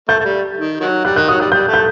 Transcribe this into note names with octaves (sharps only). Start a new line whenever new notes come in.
A3 G6
A3
G3
D#3
D#3 F#3
G3 F#6
D#3 F#6
F#3 D#6
G3 F#6
G3 G6
A3
G6